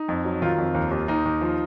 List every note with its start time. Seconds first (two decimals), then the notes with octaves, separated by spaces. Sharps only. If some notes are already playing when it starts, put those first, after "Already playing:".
Already playing: D#4
0.09 F2
0.25 F#3
0.42 D#3 F4
0.58 F2
0.74 D#2
0.91 D#2
1.08 D#2 D#4
1.25 D#2
1.41 F3